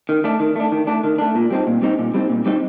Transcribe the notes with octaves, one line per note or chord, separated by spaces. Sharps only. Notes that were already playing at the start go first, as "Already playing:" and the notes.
D#3
A3 D4
D#3
A3 D4
D#3
A3 D4
D#3
A3 D4
A#2
G3 C4 D#4
A#2
G3 C4 D#4
A#2
G3 C4 D#4
A#2
G3 C4 D#4